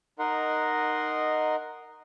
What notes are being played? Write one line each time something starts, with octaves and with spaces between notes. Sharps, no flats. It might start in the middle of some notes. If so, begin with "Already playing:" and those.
D#4 A#4 D#5 F#5 C6